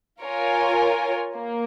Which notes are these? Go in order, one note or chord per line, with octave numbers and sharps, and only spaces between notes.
F4 A#4 C#5 G#5
A#3